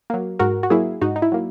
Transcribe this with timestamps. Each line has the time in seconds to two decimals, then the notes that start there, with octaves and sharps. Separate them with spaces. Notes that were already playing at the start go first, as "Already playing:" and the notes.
0.10 F#3 A#3
0.39 G#2 F#4 A#4
0.63 F#4
0.70 F#3 A#3 E4 G#4
1.01 G#2 D#4 F#4
1.16 D#4
1.22 E4
1.32 F#3 A#3